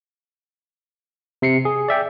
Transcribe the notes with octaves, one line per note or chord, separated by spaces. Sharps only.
C3 C7 C#7
G#4
D5 E5 G5